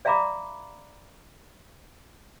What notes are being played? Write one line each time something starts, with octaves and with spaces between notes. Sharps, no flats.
D5 E5 F5 A#5 B5 D6